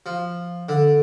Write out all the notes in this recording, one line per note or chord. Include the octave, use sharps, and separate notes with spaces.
F3
D3